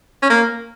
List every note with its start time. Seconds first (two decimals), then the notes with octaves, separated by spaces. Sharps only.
0.23 C#4
0.30 A#3